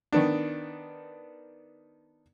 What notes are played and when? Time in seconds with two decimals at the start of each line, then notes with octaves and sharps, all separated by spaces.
0.12 D#3 B3 D4